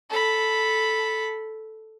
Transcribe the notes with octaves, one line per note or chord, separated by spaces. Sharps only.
A4 B5